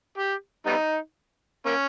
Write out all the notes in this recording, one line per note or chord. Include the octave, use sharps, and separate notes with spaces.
G4
G3 B3 D#4
A#3 C#4